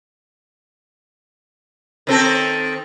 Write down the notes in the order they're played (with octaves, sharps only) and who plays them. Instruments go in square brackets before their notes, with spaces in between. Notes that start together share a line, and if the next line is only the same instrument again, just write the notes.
[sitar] D#3 C4 A4